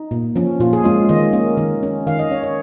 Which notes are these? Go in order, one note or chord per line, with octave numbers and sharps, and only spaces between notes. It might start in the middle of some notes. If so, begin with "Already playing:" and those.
Already playing: D#4
A#2
F3 C#4
A#2 F4
G#4
G#3 C#4 F4
D#3 D#5
A#3 C#4
D#3
C#4
D#3 F5
D#5
C#4 C#5
C#5